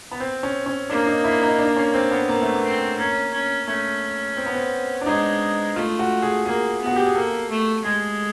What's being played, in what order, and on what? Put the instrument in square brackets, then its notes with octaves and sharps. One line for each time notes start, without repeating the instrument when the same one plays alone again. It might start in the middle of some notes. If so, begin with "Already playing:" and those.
[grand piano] B3
C4
C#4
C#4
[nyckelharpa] A#3 [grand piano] D4
[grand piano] D#4
E4
D#4
D4
C#4
C4
B3
[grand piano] A#3 [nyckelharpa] B3
[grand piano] A3
A#3
[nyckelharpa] C4
[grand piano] A#3 [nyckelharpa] C#4
[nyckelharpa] C#4
[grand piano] A3 [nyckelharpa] C#4
[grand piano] C4
B3
C4
D4
[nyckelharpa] G#3 [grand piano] D#4
[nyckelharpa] A3 [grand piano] F4
[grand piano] F#4
G#4
[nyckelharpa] A#3 [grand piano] G#4
[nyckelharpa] B3
[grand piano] F#4
G4
G#4
[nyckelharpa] A#3 [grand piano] A4
[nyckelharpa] A3
[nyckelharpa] G#3 [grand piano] G#4